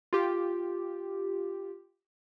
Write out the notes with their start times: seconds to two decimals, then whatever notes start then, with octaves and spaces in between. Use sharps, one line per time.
0.13 F4 G4